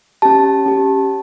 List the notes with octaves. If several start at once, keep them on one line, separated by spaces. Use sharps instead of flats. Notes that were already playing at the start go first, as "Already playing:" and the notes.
C#4 G4 A5
C#4 G4